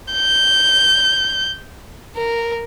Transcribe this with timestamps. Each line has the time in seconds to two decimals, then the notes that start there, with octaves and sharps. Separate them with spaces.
0.13 G6
2.17 A#4